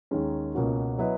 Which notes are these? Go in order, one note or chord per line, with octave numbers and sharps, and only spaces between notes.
D#2 D#3 G#3 C#4
C#2 B2 A#3 C#4 F#4
F#3 B3 E4 B4 D#5